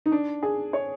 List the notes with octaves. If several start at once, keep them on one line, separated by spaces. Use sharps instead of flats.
D#4
D4
G#4
C#5